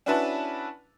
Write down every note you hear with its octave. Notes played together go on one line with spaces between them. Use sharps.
C#4 D4 E4 F#4 B4 A5